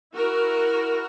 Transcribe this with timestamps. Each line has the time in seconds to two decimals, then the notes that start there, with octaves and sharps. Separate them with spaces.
0.15 E4 F#4 A#4